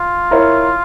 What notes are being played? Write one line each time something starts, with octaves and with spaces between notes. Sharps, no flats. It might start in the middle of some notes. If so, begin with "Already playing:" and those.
Already playing: F4
E4 A#4 C#5